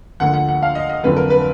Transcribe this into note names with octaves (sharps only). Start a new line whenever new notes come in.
D2 D3 F3 A#3 F#5
F#5
F#5
F5
D#5
D#5
F1 F2 D3 F#3 A#3 B4
A#4
B4